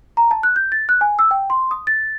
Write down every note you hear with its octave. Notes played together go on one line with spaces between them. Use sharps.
A#5
A5
F#6
G6
A6
F#6
G#5
E6
G5
C6
D#6
A6